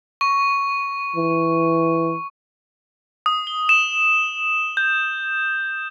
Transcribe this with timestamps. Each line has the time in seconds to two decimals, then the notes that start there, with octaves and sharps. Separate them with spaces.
0.21 C#6
1.16 E3
3.26 D#6
3.47 G7
3.69 E7
4.77 G6